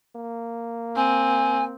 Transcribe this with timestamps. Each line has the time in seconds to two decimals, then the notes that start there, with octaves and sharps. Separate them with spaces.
0.16 A#3
0.96 C4 G#5